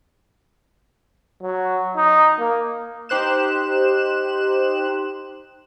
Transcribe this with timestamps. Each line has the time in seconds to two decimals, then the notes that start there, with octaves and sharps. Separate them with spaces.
1.42 F#3
1.96 D#4
2.39 A#3
3.09 D#4 G4 C5 F#6 E7